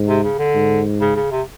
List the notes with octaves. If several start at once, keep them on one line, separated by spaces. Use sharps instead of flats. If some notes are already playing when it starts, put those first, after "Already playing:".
Already playing: G#2
C3
C#3
D3
G#2
C#3
C#3
C3